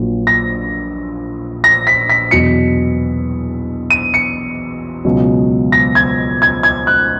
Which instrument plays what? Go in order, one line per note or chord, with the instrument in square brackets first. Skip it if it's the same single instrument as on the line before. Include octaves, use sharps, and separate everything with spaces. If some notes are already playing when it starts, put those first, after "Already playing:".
Already playing: [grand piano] A#1 A#2 F#3
A#6
A#6
B6
B6
E2 B2 F#3 C#7
D#7
C#7
C#2 B2 F#3
A#6
G#6
G#6
G#6
F#6